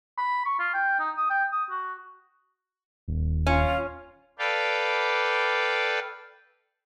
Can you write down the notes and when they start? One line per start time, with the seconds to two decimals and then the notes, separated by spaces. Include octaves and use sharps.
0.18 B5
0.45 C#6
0.59 F4
0.74 G5
0.99 D#4
1.17 D#6
1.30 G5
1.52 D#6
1.70 F#4
3.08 D#1
3.47 C#4 F4
4.39 A4 B4 D5 F5 G5